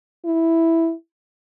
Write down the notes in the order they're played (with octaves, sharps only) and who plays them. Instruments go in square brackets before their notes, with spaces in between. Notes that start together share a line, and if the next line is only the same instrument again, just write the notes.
[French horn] E4